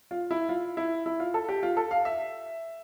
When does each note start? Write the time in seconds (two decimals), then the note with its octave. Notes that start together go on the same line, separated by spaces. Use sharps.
0.11 F4
0.31 E4
0.49 F4
0.77 E4
1.06 E4
1.20 F4
1.34 A4
1.49 G4
1.63 F4
1.77 A4
1.91 F5
2.05 E5